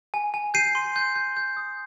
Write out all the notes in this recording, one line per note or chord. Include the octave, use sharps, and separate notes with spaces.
G#5
G#5
G6 C7 D#7
C6
G6
G6
G6
D#6